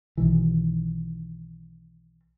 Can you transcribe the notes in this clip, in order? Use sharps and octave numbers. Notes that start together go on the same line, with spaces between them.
B1 B2 D#3 E3